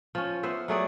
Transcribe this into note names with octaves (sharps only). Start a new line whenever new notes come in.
F3 C#4
B3 C5 E5
F#3 A3 G#4 D5